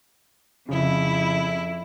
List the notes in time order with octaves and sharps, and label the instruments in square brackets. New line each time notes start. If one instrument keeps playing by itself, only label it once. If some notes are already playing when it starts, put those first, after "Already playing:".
[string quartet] F2 E4 [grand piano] C#3